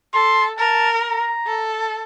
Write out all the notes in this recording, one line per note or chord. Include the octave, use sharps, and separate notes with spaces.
A4 C6
A#4 A5
A#5
A4